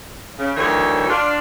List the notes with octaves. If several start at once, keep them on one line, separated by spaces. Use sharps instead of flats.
C#3
D2 D#3 E3 F#3 A4 C#5
D4 F4